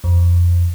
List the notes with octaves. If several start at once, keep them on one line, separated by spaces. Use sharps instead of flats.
F2